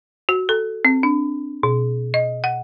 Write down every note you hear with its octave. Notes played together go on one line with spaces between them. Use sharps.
F#4
A4
C4
D4
B2
D#5
F#5